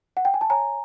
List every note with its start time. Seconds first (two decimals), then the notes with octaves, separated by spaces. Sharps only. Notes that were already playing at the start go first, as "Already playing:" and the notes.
0.17 F#5
0.25 G5
0.34 G#5
0.41 A5
0.50 C#5 G#5 A#5